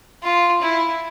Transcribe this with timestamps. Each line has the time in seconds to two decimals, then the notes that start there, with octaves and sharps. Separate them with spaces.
0.22 F4
0.62 E4